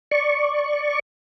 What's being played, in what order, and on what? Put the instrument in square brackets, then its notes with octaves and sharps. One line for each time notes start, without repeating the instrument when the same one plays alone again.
[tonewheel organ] D5 C#6